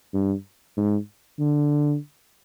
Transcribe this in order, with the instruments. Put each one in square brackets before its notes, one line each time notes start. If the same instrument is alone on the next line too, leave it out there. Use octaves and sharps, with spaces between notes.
[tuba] G2
G#2
D3